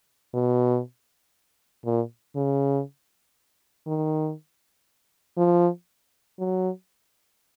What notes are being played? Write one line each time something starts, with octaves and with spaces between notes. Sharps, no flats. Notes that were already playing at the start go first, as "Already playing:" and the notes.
B2
A#2
C#3
D#3
F3
F#3